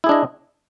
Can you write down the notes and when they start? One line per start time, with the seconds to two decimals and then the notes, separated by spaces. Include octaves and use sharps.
0.04 E4
0.06 G#4
0.09 D4
0.12 D#5